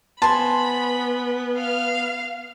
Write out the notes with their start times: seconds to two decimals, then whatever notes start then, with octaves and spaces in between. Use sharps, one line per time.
0.22 B3 C5 G#5 A5 B5
1.57 F5 F6